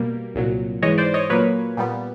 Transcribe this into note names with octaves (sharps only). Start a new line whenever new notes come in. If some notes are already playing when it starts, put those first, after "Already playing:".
Already playing: B2 G3 A#3
C2 A#2 F#3
G#2 E3 G#3 C#5 D#5
C5 D5
C#5 D#5
A#2 F#3 A#3 B4 C#5
A#2 G3 B3